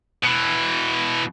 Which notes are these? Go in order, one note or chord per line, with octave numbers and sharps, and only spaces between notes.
B2 E3